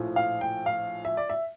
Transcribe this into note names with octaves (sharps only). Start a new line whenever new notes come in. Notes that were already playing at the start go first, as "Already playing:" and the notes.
Already playing: A#1 A2 F3
F5
G5
F5
E5
D5
E5